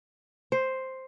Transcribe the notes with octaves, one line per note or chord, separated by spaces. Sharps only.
C5